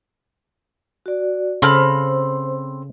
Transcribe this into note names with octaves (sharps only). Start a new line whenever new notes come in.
F#4 D5
C#3 C4 A4 C5 B5 F6